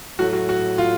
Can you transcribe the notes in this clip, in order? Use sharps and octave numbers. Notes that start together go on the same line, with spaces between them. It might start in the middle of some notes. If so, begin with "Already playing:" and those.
A2 F#3 A3 F#4
F#4
F#4
F4